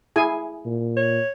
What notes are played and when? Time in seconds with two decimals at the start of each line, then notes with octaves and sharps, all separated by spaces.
0.16 E4 G#4 G#5
0.65 A#2
0.97 C#5